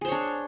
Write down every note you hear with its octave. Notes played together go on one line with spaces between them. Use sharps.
D4 G#4 C5 C#5